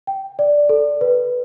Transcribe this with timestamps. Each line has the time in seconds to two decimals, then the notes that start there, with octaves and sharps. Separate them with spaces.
0.07 G5
0.39 D5
0.69 A4
1.01 B4